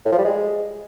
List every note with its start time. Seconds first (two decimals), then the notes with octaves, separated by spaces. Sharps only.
0.06 A2
0.12 F3
0.18 G3
0.25 G#3